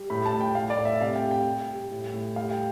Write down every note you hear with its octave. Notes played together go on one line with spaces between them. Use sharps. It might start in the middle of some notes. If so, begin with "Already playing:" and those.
Already playing: G3
A2 B5
A5
A2
G5
A2 F5
D5
A2
E5
C3 F5
G5
G3
G5
G3
G3
A2
A2
G3 F5
G5